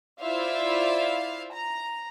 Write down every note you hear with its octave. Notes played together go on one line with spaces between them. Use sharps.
E4 F4 C5 D5 E5 F5
A#5